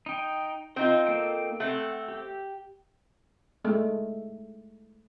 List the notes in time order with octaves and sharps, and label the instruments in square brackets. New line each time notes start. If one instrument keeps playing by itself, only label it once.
[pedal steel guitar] D#4 G5
[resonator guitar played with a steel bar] C4 D#4 F4 [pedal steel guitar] C5
[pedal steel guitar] A#3 A4 G5
[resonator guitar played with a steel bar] A3 C4 [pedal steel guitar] F#5
[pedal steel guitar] G4
[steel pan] G#3 A3